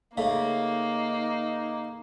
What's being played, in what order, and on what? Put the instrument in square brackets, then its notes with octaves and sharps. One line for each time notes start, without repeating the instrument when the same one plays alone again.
[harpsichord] C#3 A3 [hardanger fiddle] A#3 [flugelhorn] D#4 [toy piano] F5